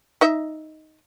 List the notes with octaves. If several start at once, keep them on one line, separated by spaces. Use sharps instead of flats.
D#4 D#5 E5